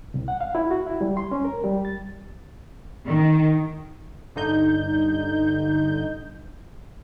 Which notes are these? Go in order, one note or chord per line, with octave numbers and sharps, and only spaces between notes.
C2
F#5
F5
E4
F#4
E4
G3
C6
C#4
A#4
G3
A6
D#3
G2 D3 D#4 G6